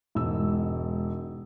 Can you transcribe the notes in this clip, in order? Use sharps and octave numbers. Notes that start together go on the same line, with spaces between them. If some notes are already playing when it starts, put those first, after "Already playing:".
E1 G#2 E6